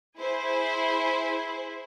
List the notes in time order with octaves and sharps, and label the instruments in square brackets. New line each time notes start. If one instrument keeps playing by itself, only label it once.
[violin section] E4 G#4 C5